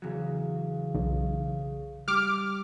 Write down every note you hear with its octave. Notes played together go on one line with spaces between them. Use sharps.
E2 C#3 F#3
B1
G3 D6 F6